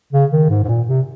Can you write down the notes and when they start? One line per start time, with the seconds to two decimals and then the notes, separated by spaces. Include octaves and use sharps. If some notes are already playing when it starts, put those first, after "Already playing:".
0.13 C#3
0.32 D#3
0.50 G#2
0.64 G#2
0.69 A#2
0.87 C3